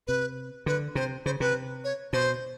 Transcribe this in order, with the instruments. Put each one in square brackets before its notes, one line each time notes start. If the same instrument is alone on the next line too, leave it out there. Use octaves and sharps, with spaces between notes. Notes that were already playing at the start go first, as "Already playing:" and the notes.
[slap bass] C3 [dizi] B4
[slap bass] D3 [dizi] B4
[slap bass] C3 [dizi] C5
[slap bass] C#3 [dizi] C5
[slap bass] C3 [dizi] B4
[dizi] C#5
[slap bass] B2 [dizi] C5